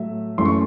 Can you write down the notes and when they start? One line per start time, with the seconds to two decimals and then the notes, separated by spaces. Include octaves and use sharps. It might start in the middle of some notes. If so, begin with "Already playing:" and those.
Already playing: A2 F#3 A3 E5
0.38 F#2 E3 A3 C6
0.45 C#6